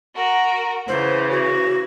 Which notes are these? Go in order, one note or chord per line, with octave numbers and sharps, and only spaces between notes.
F#4 A#4
C#3 E3 C5
F#4